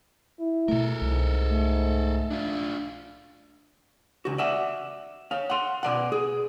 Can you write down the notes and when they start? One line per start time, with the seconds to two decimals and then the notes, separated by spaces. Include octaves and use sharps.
0.40 E4
0.68 B2 A3 A4 A#4
1.01 C2 G#2
1.45 A3
2.31 D4 F4
4.25 C#2 F#4
4.38 D5 E5 F#5
5.31 C#5 F5
5.50 F#5 C6
5.83 B2 D5 F#5
6.12 G#4